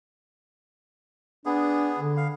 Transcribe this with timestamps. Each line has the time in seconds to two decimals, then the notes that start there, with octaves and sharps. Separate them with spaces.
1.46 B3 D4 G#4
1.99 D3
2.17 F5